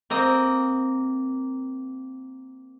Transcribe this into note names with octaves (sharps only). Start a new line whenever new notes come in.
A#3 C4 D#5 A#5